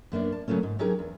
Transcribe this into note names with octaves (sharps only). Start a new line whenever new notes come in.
F#2 A#3 B3 D4
A5
C#3 F#3 A3 A#3 C#4
G#2
F#3 C#4 D#4 G4 G#4 A#4
E2